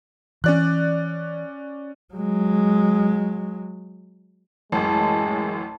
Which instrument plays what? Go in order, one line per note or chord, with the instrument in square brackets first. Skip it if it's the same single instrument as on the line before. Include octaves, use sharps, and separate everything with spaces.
[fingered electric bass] E3 [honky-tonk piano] C#4 D5 F#6
[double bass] F#3 G#3
[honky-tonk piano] A1 F#2 [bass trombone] G#3 [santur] A5